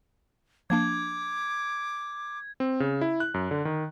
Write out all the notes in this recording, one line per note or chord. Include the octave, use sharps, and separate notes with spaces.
F3 A#3 D4 D6 G#6
C4
C#3
E4
F#6
F#2
D3
D#3